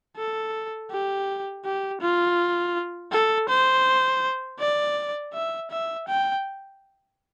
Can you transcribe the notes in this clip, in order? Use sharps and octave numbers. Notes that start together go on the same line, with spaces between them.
A4
G4
G4
F4
A4
C5
D5
E5
E5
G5